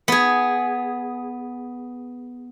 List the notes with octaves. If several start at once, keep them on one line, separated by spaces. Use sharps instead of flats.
B3 G#4